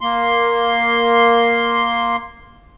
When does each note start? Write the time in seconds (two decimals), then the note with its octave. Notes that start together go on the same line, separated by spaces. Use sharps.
0.01 A#3 C6